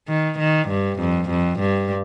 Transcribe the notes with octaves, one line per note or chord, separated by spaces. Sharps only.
D#3
D#3
G2
F2
F2
G2